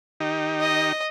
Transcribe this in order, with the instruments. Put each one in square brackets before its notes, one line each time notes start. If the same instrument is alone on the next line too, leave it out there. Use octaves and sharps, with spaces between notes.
[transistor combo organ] D#3 D#4 G4
[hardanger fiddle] D#5